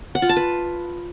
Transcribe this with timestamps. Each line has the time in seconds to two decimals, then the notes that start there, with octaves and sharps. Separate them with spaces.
0.15 F#5
0.22 F4
0.29 A5
0.37 B4